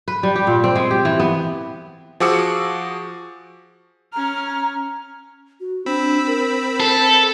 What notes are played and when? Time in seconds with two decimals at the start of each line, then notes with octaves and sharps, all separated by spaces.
0.08 B4
0.23 G3
0.36 G4
0.47 A#2
0.64 C4
0.76 G#3
0.91 G4
1.05 E3
1.20 B3
2.20 F3 F#4 G#4 D6 E6 C#7
4.13 C#4 A#5 F6
5.60 F#4
5.86 C4 D4 B5 E6
6.27 A#4
6.80 A4